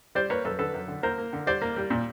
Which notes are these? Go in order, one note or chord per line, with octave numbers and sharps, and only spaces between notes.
G3 C5 D5
A#3 B4 C#5
F#2 A4 B4
D3 A4 B4
F#2
D3
A#3 A#4 C5
A#3
D3
G3 C5 D5
A#3
G3
A#2